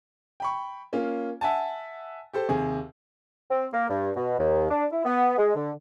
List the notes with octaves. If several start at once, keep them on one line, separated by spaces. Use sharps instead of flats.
G5 B5 C#6
A#3 C#4 F4
E5 F#5 G#5 A5
G4 A4 C5
D#2 C3 G#4
C4
A#3
G2
B2
D#2
D4
E4
B3
G#3
D3